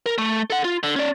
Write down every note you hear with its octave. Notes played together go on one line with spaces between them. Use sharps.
A#4
A3
A4 F#5
F4
D3
C#4 D5